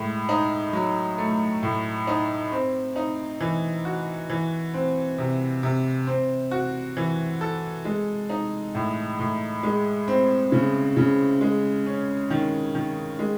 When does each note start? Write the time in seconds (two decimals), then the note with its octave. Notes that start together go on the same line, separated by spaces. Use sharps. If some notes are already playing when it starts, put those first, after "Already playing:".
Already playing: A2 G#3
0.29 D#4
0.73 F#3
1.18 A3
1.63 A2
2.07 D#4
2.52 C4
2.96 D#4
3.41 E3
3.85 F#4
4.30 E3
4.74 C4
5.18 C3
5.63 C3
6.07 C4
6.51 F#4
6.97 E3
7.41 A4
7.85 G#3
8.30 D#4
8.75 A2
9.19 A2
9.63 G#3
10.08 C4
10.52 C#3
10.97 C#3
11.41 G#3
11.86 C#4
12.30 D#3
12.75 D#3
13.19 G#3